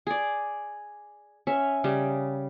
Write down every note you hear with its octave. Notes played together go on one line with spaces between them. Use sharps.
G#4 D5
C#4 E5 C#6
C#3 G3